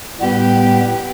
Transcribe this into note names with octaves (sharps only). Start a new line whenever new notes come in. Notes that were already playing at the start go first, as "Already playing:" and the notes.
A2 G3 B3 G4 B4